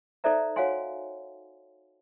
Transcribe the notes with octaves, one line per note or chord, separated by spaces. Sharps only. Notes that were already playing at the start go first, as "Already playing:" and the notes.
D#4 A4 C5 D5 E5 A#5
F#4 C#5 F5 F#5 G#5 C6